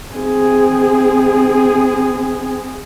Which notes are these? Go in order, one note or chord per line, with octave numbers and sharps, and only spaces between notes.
C4 G#4